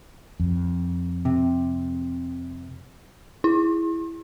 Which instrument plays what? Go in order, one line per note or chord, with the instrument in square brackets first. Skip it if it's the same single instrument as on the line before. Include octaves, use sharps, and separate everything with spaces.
[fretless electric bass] F2
[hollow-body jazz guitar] C3
[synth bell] E4